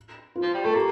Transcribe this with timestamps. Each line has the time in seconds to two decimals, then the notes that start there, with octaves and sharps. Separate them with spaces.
0.36 F4
0.43 F3
0.54 G3
0.65 A3 A4
0.75 A#3 G4